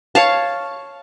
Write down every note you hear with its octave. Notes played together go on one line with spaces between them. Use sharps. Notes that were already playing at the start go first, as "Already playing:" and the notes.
C#5 F5 A5